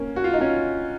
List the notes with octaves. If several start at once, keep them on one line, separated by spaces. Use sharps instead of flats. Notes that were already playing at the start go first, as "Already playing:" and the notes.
Already playing: A#3 C#4
F#4
F4
D#4
C#4 F4